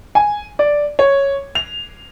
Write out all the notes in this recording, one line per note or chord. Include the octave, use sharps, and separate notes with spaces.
G#5
D5
C#5
F7